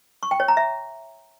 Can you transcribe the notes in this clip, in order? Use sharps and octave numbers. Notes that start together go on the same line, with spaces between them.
C#6
G5
C#5
A#5
E5